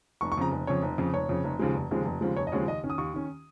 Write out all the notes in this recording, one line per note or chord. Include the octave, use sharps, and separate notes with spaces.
F1 C#6
C#6
F2 C#3 A#5
F1
F2 C#3 C#5
F1
F2 C#3
F1 C#5
F2 C#3
F1
D#2 C#3 F3 G#3
F1
D#2 C#3 F3 G#3
F1
D#2 C#3 F3 G#3
F1 C#5
D#5
D#2 C#3 F3 G#3 C#5
D#2 D#5
D#3 C#4
D#6
D#2 C#6
D#3 C#4